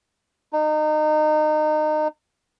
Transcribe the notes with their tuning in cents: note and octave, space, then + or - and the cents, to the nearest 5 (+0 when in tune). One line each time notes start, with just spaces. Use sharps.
D#4 -25